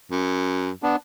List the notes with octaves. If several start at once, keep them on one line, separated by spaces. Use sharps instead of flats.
F#2
B3 D4